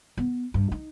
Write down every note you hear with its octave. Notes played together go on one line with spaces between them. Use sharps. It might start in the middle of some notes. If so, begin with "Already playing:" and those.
B3
G2
D#4